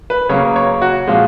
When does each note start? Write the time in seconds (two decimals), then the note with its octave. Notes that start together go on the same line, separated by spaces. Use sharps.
0.10 B4
0.29 C#3 F#3 A#3 C#5
0.56 C#5
0.82 F#4
1.07 A#2 F3 G#3 F4